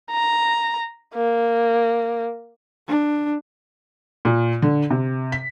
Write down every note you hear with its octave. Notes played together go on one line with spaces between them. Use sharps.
A#5
A#3
D4
A#2
D3
C3
B6